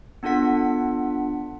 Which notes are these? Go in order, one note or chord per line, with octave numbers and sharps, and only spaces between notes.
B3 D4 F4 A4 F#5 B6